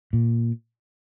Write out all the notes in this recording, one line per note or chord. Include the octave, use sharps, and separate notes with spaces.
A#2